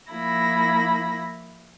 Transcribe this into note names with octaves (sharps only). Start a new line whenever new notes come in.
F3 A#3 E4 B5 A#6